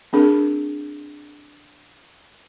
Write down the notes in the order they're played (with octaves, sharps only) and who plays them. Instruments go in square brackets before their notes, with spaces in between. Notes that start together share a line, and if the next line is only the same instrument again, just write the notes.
[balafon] C4 D4 G#4 A#4